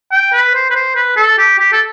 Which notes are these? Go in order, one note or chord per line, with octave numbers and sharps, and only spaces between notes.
G5
B4
C5
B4
C5
B4
A4
G4
G4
A4